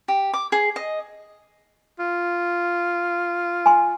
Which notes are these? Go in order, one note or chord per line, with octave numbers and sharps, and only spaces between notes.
G4
D6
G#4
D#5
F4
G#5 C6